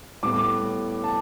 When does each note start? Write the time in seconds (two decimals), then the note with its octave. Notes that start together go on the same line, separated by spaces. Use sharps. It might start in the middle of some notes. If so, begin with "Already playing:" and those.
0.23 A2 G3 B3 D6
1.04 A5